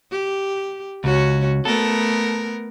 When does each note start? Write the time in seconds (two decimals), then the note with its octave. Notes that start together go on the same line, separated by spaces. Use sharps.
0.11 G4
1.04 C#2 C#4 F#4
1.65 A3 B3 A4 A#4